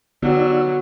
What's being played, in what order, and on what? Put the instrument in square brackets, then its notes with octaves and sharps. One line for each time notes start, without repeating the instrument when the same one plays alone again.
[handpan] D3 B3 G4 [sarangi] F#3 [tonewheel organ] D#4 D5 E6